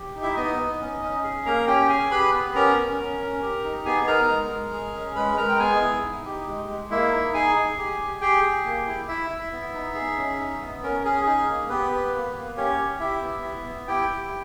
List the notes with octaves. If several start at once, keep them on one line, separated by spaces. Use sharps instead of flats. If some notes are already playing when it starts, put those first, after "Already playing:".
Already playing: G4
D#4
E4 E5
B3 D#4 D#5
B3
C#4
C#4
G#4
A#3 A#4 A#5
C#4 G4 G5
G#4 G#5
G4 B4 B5
B3
C#4 A#4 A#5
C#4
C#4
C#4
G4
D#4
B3 G#4 G#5
D#4 A#4 A#5
G#3
G#3
G#4
C#4
G#3 B4 B5
G#3 A#4 A#5
G5
B3 G#4 G#5
E4
D#4
G4
G#3
G#3
A#3 E4 E5
D#4
G#4 G#5
G#4
G4
G4
G4 G#4 G5
G#4
A#3
E4
E4 E5
E4
B3
D#4
G#4
C#4
D#4
B3
C#4 A#4
C#4 G#4
D#4 G#4
A#3
B3 G4 B4
B3
A#3
A#3
C#4 G4 C#5
G4
E4 G4 E5
B3
E4
B3
E4 G4 G5
G4